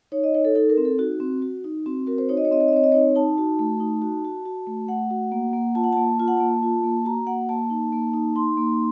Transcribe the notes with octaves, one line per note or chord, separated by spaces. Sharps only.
D#4 C#5
D#5
D#4 C#5
A4
D#4 A4
A#4
C4
A4
D#4 F#4
C4
F#4
D#4
C4 F#4
F#4 A#4
C5
D#4 C#5
D#5
C#5
C4 D#5
C#5
D#5
C4 C#5
D#5
D#4 C#5
D#4 A5
F#4
A3
D#4
F#4
F#4
F#4
A3
A3 F#5
F#4
A#3
A#3
F4 A5
F#5
A#3 A5
F4 A5
F#5
A#3 A5
F4
A#3
F#4 A#5
A#3 F#5
A#3 A5
D#4
A#3
D#4
D#4 C6
A#3